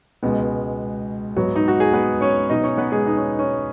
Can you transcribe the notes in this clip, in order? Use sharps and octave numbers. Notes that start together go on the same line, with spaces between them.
C#2 B2 G#3 B3
G#2 F#3 B3
D#4
F#4
G#4
B3 B4
C#4 C#5
B2 F#3 B3 D#4 D#5
C#4 C#5
B3 B4
G#3 G#4
D#4
C#4
C#4